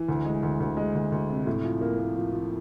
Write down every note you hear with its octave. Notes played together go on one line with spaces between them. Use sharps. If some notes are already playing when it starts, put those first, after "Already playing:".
Already playing: E3
D2
G#3
D2
D2
G#3
D2
D2
C3
A2
F3
A#3
A#3
F3
F3